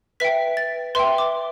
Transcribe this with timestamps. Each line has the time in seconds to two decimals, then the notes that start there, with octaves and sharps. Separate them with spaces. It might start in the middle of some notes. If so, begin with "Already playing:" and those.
0.20 B4 E5 G5 B6
0.57 A6
0.95 B4 E5 G5 C6
1.18 D6